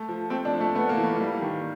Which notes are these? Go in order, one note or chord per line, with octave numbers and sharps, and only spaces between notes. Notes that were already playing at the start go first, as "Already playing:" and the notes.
Already playing: A3
F3
A3 C4
D4
F3
A3
A3 B3
A#3
E3
A3
G3 A#3
D#3